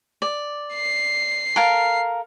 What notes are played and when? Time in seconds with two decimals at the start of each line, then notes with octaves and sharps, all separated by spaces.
0.22 D5
0.75 C7
1.56 A4 A#4 F5